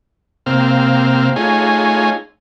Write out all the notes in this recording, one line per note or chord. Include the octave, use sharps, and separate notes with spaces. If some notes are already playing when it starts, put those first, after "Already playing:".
C3 A#3 C4 F5
A3 D#4 F4 G#4 C#5 G#5